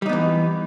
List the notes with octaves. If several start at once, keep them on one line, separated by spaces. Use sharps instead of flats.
E3 G3 B3 D#4